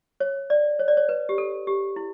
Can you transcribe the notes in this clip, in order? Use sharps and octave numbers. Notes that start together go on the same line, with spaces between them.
C#5
D5
C#5
D5
C#5
B4
G4
A4
G4
E4